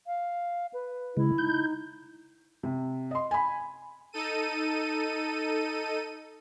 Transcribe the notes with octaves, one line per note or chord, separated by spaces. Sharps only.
F5
B4
C#3 G#3 E4
D#4 G6
C3
D#5 C6
G#5 B5
D#4 A4 D#7